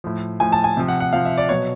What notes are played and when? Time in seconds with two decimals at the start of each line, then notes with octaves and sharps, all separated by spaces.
0.04 A2 F3
0.40 A2 F3 G#5
0.52 A5
0.64 G#5
0.77 C3 F3
0.88 F#5
1.00 F#5
1.13 C3 F3 F5
1.25 E5
1.38 D5
1.49 B2 F#3 C#5